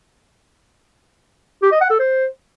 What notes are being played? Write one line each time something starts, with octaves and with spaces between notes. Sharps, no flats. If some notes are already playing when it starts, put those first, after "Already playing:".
G4
D#5
F#5
A4
C5